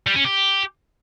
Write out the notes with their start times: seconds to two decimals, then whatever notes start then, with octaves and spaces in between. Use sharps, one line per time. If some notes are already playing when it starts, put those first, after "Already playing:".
0.07 G3
0.16 C#4
0.25 G4